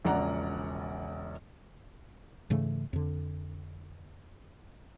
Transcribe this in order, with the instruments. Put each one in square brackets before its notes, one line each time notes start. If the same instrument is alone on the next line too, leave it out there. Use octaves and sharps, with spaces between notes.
[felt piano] E1 A#1 C#3 D5 F#5 A#5
[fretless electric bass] G#2 C#3 E3 A3
F2 D3